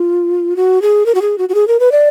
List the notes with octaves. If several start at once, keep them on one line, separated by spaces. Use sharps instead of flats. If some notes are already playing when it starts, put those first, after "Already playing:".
Already playing: F4
F#4
G#4
A#4
F#4
G#4
F#4
F#4
G#4
A#4
B4
D5